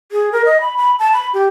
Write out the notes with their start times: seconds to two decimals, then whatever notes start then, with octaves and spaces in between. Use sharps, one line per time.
0.12 G#4
0.32 A#4
0.45 D#5
0.61 B5
0.77 B5
0.99 A5
1.13 B5
1.34 G4